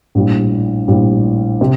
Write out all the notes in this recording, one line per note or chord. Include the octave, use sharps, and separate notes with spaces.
A#1 A2 G3
A#1 A2 G3
C3